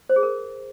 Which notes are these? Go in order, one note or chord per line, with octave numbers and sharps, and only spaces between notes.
C5
G#4
A#4